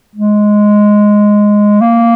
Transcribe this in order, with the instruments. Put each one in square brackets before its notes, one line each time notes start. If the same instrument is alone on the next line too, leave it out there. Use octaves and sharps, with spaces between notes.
[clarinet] G#3
A#3